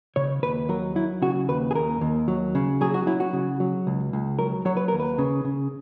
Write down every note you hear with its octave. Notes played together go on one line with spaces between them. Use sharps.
C#3 C#5
D#2 B4
F#3 A#4
F#3 E4
C#3 F#4
D#2 B4
G#4
D#2 A#4
D#2
F#3
C#3
F#3 G#4
F#4
F#3 E4
F#4
C#3
F#3
C#2
C#2
F#3 A#4
F#3 C#5
B4
D#2 A#4
B4
C#3
C#3